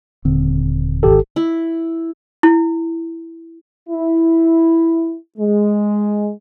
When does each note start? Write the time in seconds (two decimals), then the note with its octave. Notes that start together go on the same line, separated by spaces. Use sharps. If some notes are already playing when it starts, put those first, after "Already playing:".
0.25 D#1 D3 C4
1.03 G#1 G4 A4
1.36 E4
2.43 E4
3.89 E4
5.38 G#3